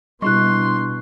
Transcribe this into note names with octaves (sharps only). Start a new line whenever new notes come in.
B2 G3 D4 E4 C6 C#6 F#6